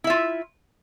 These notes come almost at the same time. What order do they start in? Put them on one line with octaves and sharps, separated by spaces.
E4 E5 F4